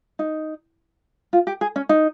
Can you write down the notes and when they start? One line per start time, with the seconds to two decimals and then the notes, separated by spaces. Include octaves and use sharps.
0.19 D#4
1.33 F4
1.47 G4
1.61 G#4
1.76 C#4
1.89 D#4